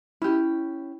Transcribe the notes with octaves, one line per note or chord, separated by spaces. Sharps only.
C#4 E4 G4